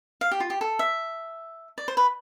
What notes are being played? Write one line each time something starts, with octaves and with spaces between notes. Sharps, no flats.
F5
G4
F4
G4
A4
E5
D5
C5
B4